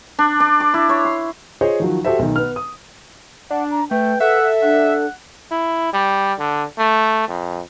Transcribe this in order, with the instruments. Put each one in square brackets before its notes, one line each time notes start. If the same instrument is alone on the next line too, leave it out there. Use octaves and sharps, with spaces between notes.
[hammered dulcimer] D4
D4
D6
E4
C#5
C6
[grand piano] F4 G#4 C5 C#5 D#5
D#3 F3 F#3
F#4 G4 A4 C5 E5
B1 D#3
B3 F6
D#6
[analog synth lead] D4 [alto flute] F#5
[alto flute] A#5
[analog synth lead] A3 [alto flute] B4 [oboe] G5
[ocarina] A4 [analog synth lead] E5 [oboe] F#5
[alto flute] D4 [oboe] F#5
[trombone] E4
G3
D3
A3
F2